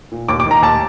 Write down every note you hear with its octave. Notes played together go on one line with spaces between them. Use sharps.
A#2
D#2 D6
D6
D#3
A#5
D#2 A5